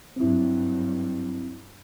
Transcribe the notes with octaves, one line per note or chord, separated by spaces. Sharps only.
G2 F#3 C4 E4